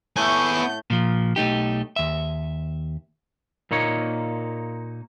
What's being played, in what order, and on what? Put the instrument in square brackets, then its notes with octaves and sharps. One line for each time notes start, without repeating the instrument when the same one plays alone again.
[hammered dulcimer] A2 A3 [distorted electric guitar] B3 G#5 [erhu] G6
[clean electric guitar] A#2 F3
B1 A3 D#4 G4
D#2 E5
A#2 A#3 D#4 C#5